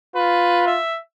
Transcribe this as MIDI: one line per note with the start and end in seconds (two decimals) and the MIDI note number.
0.15 0.79 65
0.15 0.63 71
0.66 0.97 76